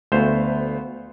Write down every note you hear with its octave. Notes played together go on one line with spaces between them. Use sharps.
D2 A3 B3 C5 F5